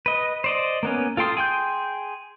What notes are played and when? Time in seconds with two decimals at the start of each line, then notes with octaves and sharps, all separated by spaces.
0.06 B4 D#5
0.44 C5 D5 D#5
0.83 A#3 B3 C#4
1.17 F4 A4 G5 C6 D#6
1.37 G#4 G5 C6 G6